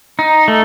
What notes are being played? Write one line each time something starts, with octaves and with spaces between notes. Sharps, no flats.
D#4
A3